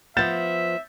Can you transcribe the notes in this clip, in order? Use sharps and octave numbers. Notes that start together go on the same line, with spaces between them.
F3 B3 E5 G6 A6 E7